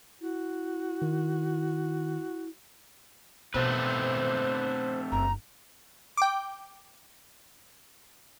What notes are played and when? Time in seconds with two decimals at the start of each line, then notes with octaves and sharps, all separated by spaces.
0.21 E4 F#4
1.02 D#3
3.54 B2 A3 C4 B4 C5
5.12 F#1 D#4 A#5
6.17 G5 D6